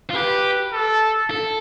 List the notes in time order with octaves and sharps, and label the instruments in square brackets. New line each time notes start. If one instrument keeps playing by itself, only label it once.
[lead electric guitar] F4
[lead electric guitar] G4 [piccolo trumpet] B4
[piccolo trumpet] A4
[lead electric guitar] A4